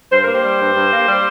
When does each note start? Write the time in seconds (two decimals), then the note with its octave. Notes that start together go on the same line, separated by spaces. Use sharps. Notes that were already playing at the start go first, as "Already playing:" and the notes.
0.12 G2 C5
0.23 A#3 A#4
0.33 G4 C5
0.44 G3
0.60 G2
0.76 G2
0.91 A#3
1.08 G3